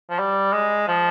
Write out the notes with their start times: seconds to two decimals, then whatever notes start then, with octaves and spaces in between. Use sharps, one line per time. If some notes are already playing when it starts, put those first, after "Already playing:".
0.10 F3
0.19 G3
0.53 G#3
0.88 F3